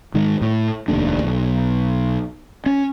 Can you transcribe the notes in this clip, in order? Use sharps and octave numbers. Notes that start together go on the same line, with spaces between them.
G#2 D#3 G#3
A2
F1 D#2 A3 D4
B1
C#4